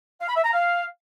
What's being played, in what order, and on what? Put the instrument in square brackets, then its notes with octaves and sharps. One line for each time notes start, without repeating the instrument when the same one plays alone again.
[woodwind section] F5
B5
E5
A#5
F5